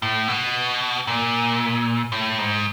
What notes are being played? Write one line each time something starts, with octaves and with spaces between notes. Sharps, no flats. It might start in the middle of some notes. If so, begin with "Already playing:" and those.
A2
B2
A#2
A2
G#2